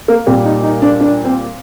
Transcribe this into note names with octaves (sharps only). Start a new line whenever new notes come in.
A#3
A#2 G3 C4
D#4
D#4
D4
D4
C4